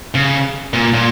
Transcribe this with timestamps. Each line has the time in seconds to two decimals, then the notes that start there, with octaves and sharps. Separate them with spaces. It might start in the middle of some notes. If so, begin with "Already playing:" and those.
0.15 C#3
0.73 A#2
0.94 A#2